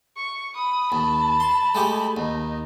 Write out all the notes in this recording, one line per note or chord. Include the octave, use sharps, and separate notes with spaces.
C#6
B5 D#6
D#2 A5
C6
G#3 A3 G4
D#2 D#4